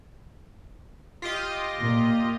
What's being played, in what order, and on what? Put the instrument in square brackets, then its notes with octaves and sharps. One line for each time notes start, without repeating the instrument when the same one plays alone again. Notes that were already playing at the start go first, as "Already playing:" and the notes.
[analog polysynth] F4 G4 D#5
[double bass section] A#2